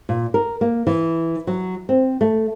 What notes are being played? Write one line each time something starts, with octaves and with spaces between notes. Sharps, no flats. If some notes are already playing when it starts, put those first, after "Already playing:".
A#2
A#4
A#3
E3
F#3
C4
A3